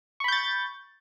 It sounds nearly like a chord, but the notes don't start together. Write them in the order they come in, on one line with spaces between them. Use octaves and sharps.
C#6 B5 G6 A6